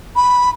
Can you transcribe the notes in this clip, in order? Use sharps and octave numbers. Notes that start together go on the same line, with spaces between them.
B5